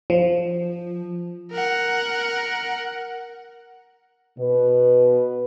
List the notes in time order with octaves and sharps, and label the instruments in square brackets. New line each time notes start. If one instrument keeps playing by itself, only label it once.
[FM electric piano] F3
[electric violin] A#4 F#5
[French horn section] B2 B4